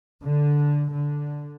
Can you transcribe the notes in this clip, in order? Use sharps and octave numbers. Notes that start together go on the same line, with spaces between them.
D3
D3